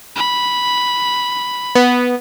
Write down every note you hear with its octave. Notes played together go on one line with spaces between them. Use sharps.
B5
B3